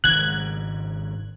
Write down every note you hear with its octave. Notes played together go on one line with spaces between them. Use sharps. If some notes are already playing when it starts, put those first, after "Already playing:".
G#1 G#2 C#3 F#6 G#6